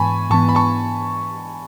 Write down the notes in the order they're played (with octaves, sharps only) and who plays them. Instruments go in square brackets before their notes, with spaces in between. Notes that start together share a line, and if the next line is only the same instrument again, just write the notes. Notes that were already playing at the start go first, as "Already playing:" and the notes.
Already playing: [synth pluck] G#2 E3 B3 [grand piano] G#5 A5 B5 C#6
[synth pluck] G#2 E3 B3 [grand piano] A5 C#6
[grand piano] B5
A5 C#6